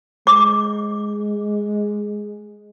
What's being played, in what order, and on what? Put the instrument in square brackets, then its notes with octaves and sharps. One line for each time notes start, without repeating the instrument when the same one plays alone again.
[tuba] G#3 [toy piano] D6